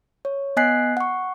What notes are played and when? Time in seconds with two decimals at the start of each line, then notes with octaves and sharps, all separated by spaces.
0.25 C#5
0.57 B3 D#5 G#5 F#6 B6 C7
0.97 F#5 C#6